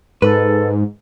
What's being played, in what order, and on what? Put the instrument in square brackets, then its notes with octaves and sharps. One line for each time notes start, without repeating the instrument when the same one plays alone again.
[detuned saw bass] G#2 [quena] A4 [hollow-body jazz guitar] B4